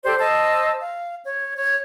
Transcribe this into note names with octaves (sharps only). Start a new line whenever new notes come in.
G4 A4 C5 D5
C5 D#5 A5 E6
F5
C#5
C#5